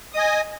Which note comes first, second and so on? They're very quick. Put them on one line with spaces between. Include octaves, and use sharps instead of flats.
D#6 D#5 G#5